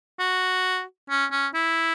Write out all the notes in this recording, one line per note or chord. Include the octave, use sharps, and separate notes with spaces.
F#4
C#4
C#4
E4